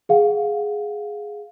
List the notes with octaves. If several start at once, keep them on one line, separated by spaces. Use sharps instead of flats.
G#4 F5 F#5